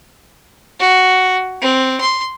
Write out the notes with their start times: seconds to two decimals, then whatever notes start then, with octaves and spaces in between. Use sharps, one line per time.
0.80 F#4
1.61 C4
2.00 C6